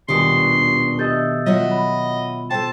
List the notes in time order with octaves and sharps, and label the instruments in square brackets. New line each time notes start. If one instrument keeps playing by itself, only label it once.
[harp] D#1 B2 C#6 [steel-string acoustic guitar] D4 B4 [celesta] G4 D#6 [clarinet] C6
[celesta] G4 G6 A6 [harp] A4 D#5 E5
[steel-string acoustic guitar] F#3 E5 F#5 [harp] F4 [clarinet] D#5
[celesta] B5
[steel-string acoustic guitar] A4 C5 [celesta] G5 [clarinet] A5